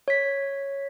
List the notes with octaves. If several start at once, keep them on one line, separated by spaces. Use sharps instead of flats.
C#5 B6